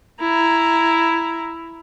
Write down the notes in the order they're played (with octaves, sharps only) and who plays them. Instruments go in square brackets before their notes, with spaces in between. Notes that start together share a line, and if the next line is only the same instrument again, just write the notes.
[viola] E4 A#5